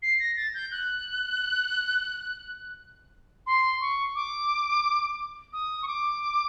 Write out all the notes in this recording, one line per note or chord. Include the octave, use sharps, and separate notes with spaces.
C7
A#6
A6
G6
F#6
C6
C#6
D6
D#6
C#6
D6